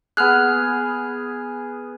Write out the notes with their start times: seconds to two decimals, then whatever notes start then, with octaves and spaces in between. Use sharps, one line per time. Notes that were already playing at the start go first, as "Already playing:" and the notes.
0.17 B3 G#4 F6 F#6